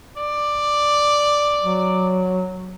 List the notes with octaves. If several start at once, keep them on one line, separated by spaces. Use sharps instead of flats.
D5
F#3